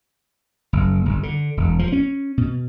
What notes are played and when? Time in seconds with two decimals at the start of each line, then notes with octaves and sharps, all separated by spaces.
0.73 F#1
1.05 G1
1.23 D3
1.57 E1
1.79 F3
1.92 C#4
2.38 B2